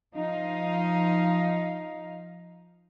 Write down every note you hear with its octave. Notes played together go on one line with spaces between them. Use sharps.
F3 D#4 F5